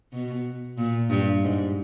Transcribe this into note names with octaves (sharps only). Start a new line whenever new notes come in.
B2
A#2
G2
G#2